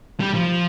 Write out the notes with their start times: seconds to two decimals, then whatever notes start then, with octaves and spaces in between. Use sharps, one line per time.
0.20 G3
0.35 F3